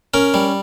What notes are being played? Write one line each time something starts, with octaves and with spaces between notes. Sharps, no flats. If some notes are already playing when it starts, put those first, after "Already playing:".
C#4 A#4
G3